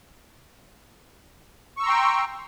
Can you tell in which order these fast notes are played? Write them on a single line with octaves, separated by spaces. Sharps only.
C#6 E6 A#5 C6 G5